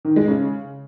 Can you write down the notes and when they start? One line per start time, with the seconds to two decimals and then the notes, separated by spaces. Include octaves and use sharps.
0.05 D#3
0.16 G#3
0.28 C#3